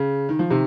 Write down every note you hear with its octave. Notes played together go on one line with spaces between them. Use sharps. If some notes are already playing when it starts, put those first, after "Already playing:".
Already playing: C#3
D#3
F3
C3 D#3